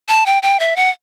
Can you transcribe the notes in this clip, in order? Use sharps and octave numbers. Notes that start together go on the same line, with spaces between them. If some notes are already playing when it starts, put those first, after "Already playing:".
A5
G5
G5
E5
F#5